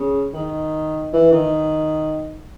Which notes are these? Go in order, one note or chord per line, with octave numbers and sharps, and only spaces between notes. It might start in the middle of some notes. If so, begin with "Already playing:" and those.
Already playing: C#3
D#3
E3
D#3